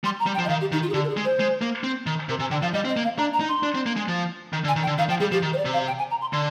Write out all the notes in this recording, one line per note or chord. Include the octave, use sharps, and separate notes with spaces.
G3 C6
A#5
G3
G5
F3
D#5
D#3 F5
G4
D#3 D#4
F4
G#4
D3 G4
A#4
G#4
G#3
C5
G#3
A#3
C4
D#3
C3 A#4
C3 G#5
D3 G5
F3 F5
G3 D#5
C4
D#5
A#3
F5
D4 A#5
A#5
D#4
C6
D4
C4
A#3
G#3
F3
D#3
D3
G#5
D#3
G5
D3
D#3 F5
F3 G5
G3 G#4
F3 G4
D#3
C5
D5
C3
F5
G5
G#5
A#5
C6
D3 C6